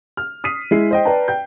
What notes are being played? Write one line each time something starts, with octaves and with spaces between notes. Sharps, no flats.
F6
D#6 B6 C7 D#7
G#3 E4 C7
C5 D#5 G5
B4 D5 G5 A5 A#5
G5 G6